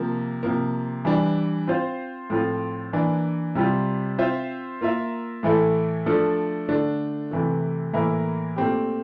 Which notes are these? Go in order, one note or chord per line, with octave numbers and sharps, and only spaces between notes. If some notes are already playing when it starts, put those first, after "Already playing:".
Already playing: C3 F3 A#3
C3 F3 A#3
E3 G3 D4
C4 F4 C5 F5
A2 F3 C4 F4
E3 A#3 D4
C3 G3 C4 F4
C4 F4 C5 E5
A#3 F4 A#4 E5
A2 E3 A3 E4 A4
F3 A3 D4 A4 D5
D3 A3 D4
C3 E3 A3
A2 E3 A#3 E4 A#4
A#2 A3 C4 G4